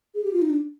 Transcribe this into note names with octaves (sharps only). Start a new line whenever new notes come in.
G#4
G4
F4
D#4
D4